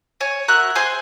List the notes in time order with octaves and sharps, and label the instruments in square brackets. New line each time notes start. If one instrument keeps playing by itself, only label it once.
[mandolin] C#5 G#5
F#4 A#4 E5 F#6
G#4 C5 G#5 C6